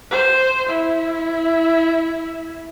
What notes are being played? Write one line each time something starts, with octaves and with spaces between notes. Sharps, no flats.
C5
E4